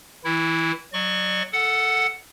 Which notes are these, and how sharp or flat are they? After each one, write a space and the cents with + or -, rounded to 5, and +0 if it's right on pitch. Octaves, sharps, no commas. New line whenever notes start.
E3 -25 E4 +0
F#3 +0 D5 +40 C#6 +0
A4 +0 F#5 +0